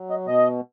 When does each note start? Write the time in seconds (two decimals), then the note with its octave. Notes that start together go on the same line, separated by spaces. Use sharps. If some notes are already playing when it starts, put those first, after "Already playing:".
Already playing: F#3
0.10 D#5
0.26 B2 D#5